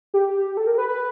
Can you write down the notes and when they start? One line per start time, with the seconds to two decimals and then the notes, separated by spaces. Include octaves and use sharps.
0.14 G4
0.57 A4
0.67 A#4
0.78 B4
0.89 B4